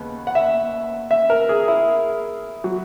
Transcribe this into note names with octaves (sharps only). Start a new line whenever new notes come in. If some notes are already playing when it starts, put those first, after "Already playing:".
Already playing: D#2 C#3 B3
F#5
E5
E5
A#4
G#4
E4
F#3